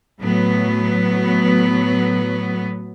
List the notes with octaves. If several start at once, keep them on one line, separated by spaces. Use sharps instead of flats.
A2 F#3 B3